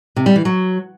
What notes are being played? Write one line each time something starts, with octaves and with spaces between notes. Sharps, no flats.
C3
G3
E3
F#3